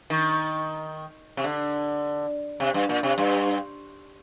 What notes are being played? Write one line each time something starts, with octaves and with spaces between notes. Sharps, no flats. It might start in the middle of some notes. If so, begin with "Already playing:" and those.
D#3
C3
D3
C3
G2
A#2
C3
G2